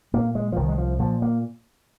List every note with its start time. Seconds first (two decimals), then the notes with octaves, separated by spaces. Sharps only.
0.13 A#2 A#3
0.35 G#3
0.52 F3
0.56 C2 D#3
0.69 G#3
0.78 F3
0.99 A#2 F3
1.22 A#3